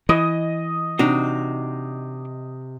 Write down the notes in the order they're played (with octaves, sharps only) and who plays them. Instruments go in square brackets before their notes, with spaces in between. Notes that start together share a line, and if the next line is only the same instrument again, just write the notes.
[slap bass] E3 [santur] D#5
[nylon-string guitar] C3 [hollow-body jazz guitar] D4 D#4 F#4